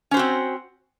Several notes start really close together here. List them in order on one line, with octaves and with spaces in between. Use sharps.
C#4 C5 F#4 C4